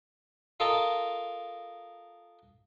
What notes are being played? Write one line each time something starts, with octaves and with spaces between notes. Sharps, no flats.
F4 A4 A#4 D#5 A5